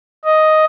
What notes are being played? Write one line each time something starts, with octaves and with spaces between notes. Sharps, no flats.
D#5